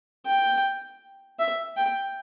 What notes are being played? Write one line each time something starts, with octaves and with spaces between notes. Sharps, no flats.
G5
E5
G5